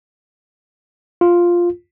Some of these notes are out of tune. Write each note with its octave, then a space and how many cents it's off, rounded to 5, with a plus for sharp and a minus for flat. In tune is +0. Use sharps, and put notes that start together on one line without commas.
F4 +0